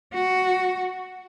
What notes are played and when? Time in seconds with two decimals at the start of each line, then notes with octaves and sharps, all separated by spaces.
0.13 F#4